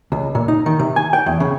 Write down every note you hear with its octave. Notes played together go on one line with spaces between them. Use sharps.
C#2
A#2
D#4
D#3
C3
G#5
G5
E2
C#3